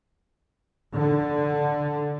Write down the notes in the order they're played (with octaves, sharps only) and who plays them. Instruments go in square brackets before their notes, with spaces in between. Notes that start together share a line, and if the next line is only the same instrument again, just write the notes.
[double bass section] D3